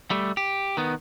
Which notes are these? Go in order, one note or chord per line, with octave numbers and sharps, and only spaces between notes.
G3 A3
G4
D#3 B3